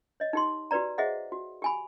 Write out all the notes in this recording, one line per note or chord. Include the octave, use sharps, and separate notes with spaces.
C#5 D#5
D#4 G4 C6
F#4 G4 B4 D5 A#5
G#4 C5 D#5 E5 F#5
F#4
G4 G#5 B5